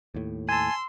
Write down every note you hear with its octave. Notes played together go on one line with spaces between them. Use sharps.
D#2 A2
G#5 A5 C6 E6